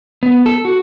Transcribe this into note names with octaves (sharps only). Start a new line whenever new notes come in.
B3
A4
F#4